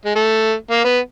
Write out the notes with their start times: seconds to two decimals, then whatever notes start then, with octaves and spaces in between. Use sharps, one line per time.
0.06 G#3
0.16 A3
0.71 A#3
0.85 B3